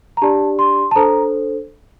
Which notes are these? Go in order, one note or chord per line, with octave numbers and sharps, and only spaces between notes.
A#5
D4 G4 D5 A5
C6
A5
D4 A4 C5 A#5